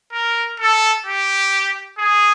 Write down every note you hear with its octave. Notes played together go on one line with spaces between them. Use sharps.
A#4
A4
G4
G#4